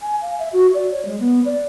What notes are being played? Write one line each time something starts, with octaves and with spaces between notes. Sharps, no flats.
G#5
F5
E5
F#4
D5
C#5
G#3
B3
D5